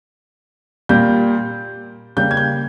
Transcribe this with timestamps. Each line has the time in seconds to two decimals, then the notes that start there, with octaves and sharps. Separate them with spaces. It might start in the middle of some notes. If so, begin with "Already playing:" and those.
0.89 A#2 G3 A#3 G6
2.17 C#3 G3 A#3 G6
2.31 G#6
2.37 G6